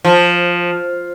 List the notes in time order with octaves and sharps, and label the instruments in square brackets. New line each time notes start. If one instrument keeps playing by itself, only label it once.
[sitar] F3